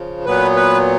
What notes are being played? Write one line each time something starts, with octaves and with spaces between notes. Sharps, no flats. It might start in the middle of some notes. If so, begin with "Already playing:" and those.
Already playing: C#3 F3
A#2 F#3 B3 B4
B4